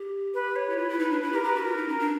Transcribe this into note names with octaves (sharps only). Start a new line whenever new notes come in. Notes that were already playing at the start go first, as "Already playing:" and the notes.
Already playing: G4
B4
C#5
E4
F4 B4
E4
D#4
D4
E4 B4
G4
A#4
G4
B4
F#4
F4 A#4
D#4
C#4
D4